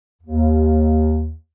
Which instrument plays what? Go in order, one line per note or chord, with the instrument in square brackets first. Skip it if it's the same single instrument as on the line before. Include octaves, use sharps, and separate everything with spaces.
[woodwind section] D#2